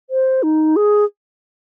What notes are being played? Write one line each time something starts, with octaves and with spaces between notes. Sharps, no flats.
C5
D#4
G#4